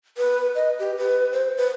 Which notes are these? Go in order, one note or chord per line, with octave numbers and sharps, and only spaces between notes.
B4
D#5
G4
B4
C5
B4